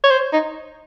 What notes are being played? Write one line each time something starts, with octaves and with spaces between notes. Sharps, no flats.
C#5
C5
D#4